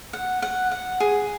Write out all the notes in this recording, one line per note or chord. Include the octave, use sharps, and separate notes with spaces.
F#5
F#5
F#5
G#4